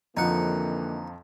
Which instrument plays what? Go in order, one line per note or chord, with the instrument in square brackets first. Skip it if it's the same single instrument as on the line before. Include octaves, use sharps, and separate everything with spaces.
[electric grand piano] F2 F3 [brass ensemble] D3 E3 A#3 [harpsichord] D#4 F#5